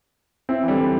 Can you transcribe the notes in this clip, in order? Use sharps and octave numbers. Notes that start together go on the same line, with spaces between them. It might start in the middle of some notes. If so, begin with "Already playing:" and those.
C4 E4
E3
D3 G3